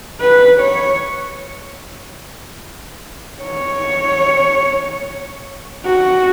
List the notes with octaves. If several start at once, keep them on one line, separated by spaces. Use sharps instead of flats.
B4
C#5
C#5
F#4